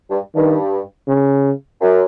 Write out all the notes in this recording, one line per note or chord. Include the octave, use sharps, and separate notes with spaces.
G2
G2 D#3
C#3
F#2